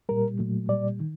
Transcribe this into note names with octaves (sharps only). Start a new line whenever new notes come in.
A#2 G3 A#4
A#2 F#3 A3
A#2 G3 D5
D#3